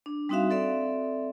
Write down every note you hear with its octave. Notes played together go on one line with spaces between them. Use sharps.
D4
G3 C4 D#4 F#4 E5 F5
C4 A4 D5 E5